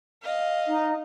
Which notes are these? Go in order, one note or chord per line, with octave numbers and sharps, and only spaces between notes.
D#5 F5
D#4